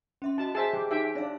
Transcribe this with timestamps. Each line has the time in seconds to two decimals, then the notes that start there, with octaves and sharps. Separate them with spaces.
0.22 C#4 E5 C6
0.38 E4 F#4 D#5 A5
0.55 G#4 C5 E5 A5
0.73 E3 G4
0.91 D#4 G4 E5 G5
1.15 D4 C#5 F5